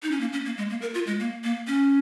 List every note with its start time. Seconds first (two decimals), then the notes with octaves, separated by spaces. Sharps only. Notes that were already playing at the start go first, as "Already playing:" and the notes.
0.03 D#4
0.11 C#4
0.21 A#3
0.33 C#4
0.45 A#3
0.57 G#3
0.70 A#3
0.82 A#4
0.94 F4
1.07 G#3
1.19 A#3
1.44 A#3
1.67 C#4